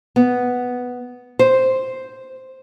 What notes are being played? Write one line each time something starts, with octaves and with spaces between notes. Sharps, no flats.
B3
C5